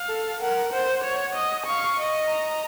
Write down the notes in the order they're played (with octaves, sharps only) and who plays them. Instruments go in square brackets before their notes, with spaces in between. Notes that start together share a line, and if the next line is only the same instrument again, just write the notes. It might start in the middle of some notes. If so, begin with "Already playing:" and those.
Already playing: [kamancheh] F5
[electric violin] A4
[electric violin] A#4 [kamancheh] F#5
[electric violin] C5 [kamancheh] F#5
[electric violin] C#5
D#5
[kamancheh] F5 [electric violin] C#6
[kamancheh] D#5
[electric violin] A#5